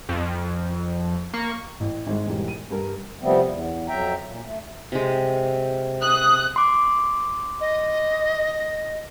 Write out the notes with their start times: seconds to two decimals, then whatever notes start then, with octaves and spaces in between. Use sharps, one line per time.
0.09 F2
1.34 A#3 C#6
1.80 A1
2.07 G#1 G#3
2.27 E1 G#2 G3
2.48 D#7
2.71 G2 A#4
3.21 C3 F3 G3 A3 B3 C4
3.47 E2
3.88 F2 F#3 E5 G5 A#5
4.24 A#2
4.44 A3
4.92 C3 G#3
6.02 D#6 F#6
6.56 C6 D6
7.61 D#5